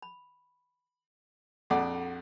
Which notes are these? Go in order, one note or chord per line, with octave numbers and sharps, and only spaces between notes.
B5
A#1 F2 F#4 A4 D5 F#5